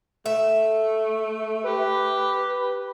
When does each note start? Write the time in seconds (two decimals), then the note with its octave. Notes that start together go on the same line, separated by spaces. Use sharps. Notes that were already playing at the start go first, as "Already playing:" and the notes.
0.26 A3 E5
1.64 G4 B4